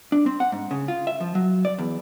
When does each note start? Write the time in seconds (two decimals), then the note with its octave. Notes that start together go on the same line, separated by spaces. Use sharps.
0.12 D4
0.26 C4
0.40 F#5
0.52 G#2
0.71 C#3
0.88 F4
1.07 E5
1.20 F3
1.35 F#3
1.65 D5
1.78 E2